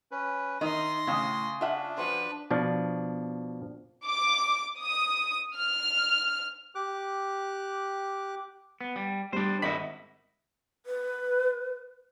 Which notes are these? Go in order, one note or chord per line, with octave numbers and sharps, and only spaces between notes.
C#4 B4
D#3 D#4 E5 C6 A#6
A2 C#3 D#6
D4 F4 E5 F#5
F3 F#4 B4 C5
B2 F3 D4
D6
D#6
F6
G4 D6 F#6
B3
G3
G3 D4 C5
G#1 D#5 E5 B5 B6
B4